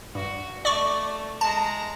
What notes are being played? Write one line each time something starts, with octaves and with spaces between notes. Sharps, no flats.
G2 F#4
A3 D5 C#6 D6
G#3 A5 A#5